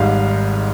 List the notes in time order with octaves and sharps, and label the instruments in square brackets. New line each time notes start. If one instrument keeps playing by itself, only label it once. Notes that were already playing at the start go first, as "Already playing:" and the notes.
Already playing: [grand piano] G#1 G#2 G3 F5